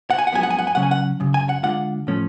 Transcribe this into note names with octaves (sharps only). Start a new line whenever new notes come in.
F#5
G#5
F#5
F#2 F3 G#3 B3 G#5
F#5
G#5
F#5
G#5
C#3 F#3 C#4 F#5
G#5
F#5
F#2 C#3
G#5
F#5
D3 G#3 D4 F4 F#5
A2 F3 A3 C#4